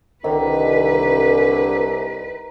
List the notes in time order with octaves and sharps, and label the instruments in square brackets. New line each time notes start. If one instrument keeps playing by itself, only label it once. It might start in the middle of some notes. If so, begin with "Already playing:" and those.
[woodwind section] C2 [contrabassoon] D3 [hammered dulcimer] D#3 [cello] B4